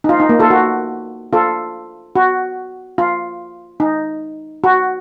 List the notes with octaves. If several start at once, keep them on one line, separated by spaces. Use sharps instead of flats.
D#4
F4
D#4
A#3
F4 A4
F#4
F4 A4
F#4
F4
D#4
F#4